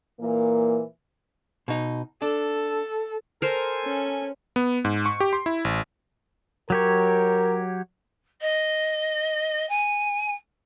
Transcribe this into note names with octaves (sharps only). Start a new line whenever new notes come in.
A#2 E3 A#3
B2 D#4
D4 A4
A4 A#4 C5 G#5
C#4
B3
G#2
C#6
G4
C6
E4
A1
F#3 G4 A#4 C#5
D#5
G#5